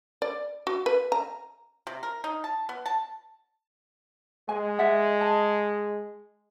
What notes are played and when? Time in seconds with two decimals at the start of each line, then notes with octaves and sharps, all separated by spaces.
0.22 D5
0.67 F#4
0.86 B4
1.12 A#5
1.87 C3
2.03 A#4
2.24 D#4
2.44 A5
2.69 B3
2.86 A5
4.49 G#3 G#5
4.79 D5 E5 F#5
5.21 A5